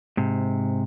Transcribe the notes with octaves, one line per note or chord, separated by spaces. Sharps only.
G#2 C3